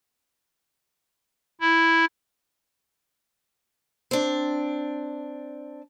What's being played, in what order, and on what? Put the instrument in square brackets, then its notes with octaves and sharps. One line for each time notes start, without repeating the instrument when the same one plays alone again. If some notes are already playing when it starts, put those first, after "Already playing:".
[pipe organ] E4
[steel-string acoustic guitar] C4 D4